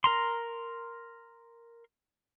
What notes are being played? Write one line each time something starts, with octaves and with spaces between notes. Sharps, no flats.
A#4 A#5 C6